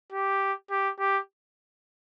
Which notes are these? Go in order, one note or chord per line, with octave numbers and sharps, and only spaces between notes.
G4
G4
G4